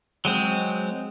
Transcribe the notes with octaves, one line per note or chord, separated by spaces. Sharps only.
F#3 G#3 C4